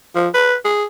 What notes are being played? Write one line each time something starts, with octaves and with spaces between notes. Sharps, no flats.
F3
B4
G#4